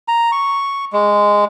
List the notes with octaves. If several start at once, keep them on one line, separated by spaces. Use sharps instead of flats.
A#5
C#6
G#3